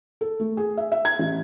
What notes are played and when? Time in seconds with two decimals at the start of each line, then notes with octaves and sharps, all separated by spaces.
0.21 A4
0.40 A3
0.57 G#4
0.77 E5
0.92 E5
1.05 G#6
1.19 A1